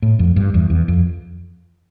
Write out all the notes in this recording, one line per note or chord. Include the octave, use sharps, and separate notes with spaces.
A2
F2
G2
E2
E2
F2